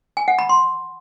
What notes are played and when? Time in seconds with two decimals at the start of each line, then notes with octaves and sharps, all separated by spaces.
0.17 G#5
0.28 F#5
0.39 B5
0.49 C6